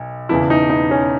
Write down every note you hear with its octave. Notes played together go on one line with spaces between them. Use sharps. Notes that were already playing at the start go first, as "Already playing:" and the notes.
Already playing: B1
E1 E2 C#3 E4
D#4
D#4
C#4